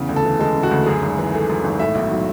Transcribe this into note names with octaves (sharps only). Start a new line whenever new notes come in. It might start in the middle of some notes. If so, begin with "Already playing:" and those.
Already playing: E2 C#3
D2
A4
E3
G#3 A4
C#3
F#4
D2
F#2 G#4
G#1
E3
A3
F#2
G#1
A2 E5
B1
F#3